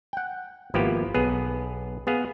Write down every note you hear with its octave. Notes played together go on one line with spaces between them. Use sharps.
F#5 G5
G#1 F3 A#3 B3 E4 G4
B1 B3 G#4 B4
B3 G#4 F5